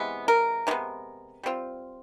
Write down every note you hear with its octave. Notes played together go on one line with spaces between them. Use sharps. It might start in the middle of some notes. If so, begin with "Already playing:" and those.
Already playing: C3 E3 G#3 B3
A#4
C3 E3 G#3 B3
G3 C4 F4